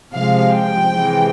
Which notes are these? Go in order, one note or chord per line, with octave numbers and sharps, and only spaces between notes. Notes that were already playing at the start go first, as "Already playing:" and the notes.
C3 F3 G#3 F5
G5
C3 E3 G#3